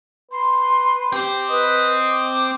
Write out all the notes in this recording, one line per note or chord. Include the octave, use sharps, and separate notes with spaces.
B4 C6
C4 G4 C5
B4 D#5
D6